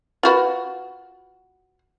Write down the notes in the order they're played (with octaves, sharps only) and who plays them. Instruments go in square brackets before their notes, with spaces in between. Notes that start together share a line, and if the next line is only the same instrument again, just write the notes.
[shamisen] F4 F#4 B4